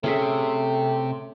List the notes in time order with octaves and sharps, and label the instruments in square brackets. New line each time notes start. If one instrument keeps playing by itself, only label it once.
[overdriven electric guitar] C3 [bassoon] A3 [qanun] C#4 G#4 E5